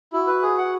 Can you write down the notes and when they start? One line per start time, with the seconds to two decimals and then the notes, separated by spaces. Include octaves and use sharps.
0.13 E4 F#4
0.27 B4
0.42 G#4
0.58 F#5